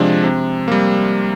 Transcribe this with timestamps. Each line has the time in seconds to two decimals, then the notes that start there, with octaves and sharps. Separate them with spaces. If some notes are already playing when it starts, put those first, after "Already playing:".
Already playing: C3 F3 G#3 D4
0.24 C3
0.68 G3 A#3